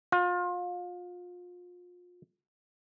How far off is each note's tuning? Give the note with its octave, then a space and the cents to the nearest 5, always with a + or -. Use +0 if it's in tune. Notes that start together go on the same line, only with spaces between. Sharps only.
F4 +30